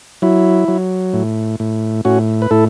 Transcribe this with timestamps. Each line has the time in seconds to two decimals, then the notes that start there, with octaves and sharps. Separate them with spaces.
0.22 F#3 E4
0.68 F#3
1.13 A2
1.60 A2
2.05 A2 C#4 F#4
2.42 B4
2.51 A2 E4 A4